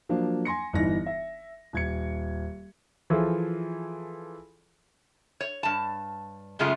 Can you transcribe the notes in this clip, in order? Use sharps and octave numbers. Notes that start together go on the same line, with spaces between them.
F3 F#3 A#3 D4
G#5 C6 A#6 C#7
G1 E3 D#4 A#6
E5
D#1 G#6 C#7
E3 F3 F4 G#4 A4
C#5
G2 A5
F#2 C#3 G#3 A3 F4